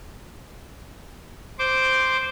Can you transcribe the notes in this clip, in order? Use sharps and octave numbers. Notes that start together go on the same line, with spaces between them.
C5 D6